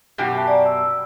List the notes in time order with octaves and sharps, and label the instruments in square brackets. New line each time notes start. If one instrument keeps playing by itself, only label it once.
[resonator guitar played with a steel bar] F#2 B2 G4
[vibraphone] E5 G#5 A5
D5 A#5
E6